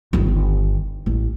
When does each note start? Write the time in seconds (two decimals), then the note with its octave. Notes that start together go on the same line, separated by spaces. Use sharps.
0.13 G1 D#3
1.06 A1